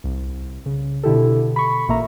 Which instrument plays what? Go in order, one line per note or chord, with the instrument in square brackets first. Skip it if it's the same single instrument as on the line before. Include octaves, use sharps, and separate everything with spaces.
[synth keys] C2
C#3
B2 D3 E4 G4 A4
B5 C#6
A1 A#2 A#3 E5 A#5